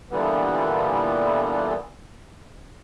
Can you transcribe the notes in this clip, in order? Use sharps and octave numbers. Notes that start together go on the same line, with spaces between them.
A#2 D3 E3 G3 B3